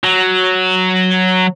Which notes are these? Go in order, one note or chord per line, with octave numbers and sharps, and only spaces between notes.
F#3